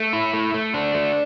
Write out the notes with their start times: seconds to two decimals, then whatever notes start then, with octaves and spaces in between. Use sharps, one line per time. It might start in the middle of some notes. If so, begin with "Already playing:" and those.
Already playing: A3
0.13 E4
0.34 A3
0.54 A3
0.74 D4
0.95 A3